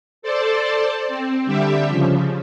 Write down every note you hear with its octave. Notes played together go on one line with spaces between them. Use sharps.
A4 C5 D5 A5
C4
D3 G3 G4 E5
C#3 F3